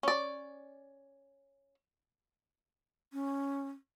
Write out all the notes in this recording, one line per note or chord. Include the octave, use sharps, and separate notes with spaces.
C#4 D5
C#4